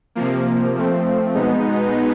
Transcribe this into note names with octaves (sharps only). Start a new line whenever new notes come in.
C3 F3 A#3
F3 A3 C4
B2 G#3 B3 D#4